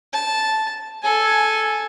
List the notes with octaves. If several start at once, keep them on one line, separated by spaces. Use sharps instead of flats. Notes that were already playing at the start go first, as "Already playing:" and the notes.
A5
A4 G#5